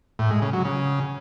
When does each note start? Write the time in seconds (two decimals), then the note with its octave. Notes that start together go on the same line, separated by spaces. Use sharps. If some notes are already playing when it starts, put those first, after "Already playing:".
0.19 A2
0.30 G#3
0.42 C#3
0.53 F#3
0.65 C#3